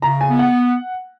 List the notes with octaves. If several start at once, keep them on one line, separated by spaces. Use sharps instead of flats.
C#3 A#5
G#5
B3
F#5